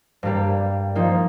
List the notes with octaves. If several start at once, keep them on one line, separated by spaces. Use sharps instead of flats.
G2 G3 A#3 G4
F3 A#3 D#4